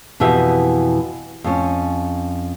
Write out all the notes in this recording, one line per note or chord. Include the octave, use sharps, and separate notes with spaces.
F2 B2 E3 G4 E5
F2 C#4